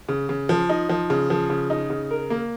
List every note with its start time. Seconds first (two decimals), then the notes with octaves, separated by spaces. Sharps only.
0.09 C#3
0.29 C#3
0.49 F3
0.69 D#4
0.89 F3
1.10 C#3
1.30 F3
1.50 C#3
1.70 D#4
1.90 C#3
2.10 A#4
2.30 A#3